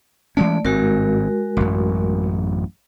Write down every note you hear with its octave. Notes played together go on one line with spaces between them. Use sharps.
E3 G#3 A3 C#4 D5
G#1 G2 G#3 C4 F#4 A#4
A1 F#2